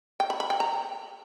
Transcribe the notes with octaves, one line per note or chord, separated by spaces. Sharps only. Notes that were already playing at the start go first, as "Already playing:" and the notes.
G5
B5
B5
G5
A#5